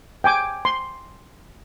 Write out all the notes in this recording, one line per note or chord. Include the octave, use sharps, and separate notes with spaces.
G5 G#5 D6
C6